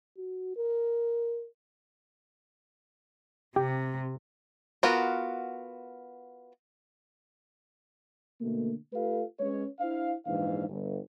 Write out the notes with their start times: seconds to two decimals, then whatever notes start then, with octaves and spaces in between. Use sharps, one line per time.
0.17 F#4
0.57 A#4
3.56 C3 G4
4.83 B3 F4 F#4 A#4
8.41 B2 D3 A3 A#3
8.93 A3 F4 G4 A4 B4 F5
9.39 G#3 C#4 B4 C#5
9.80 D4 E4 C5 F5
10.26 A#1 G#2 E3 D4 F5
10.68 G1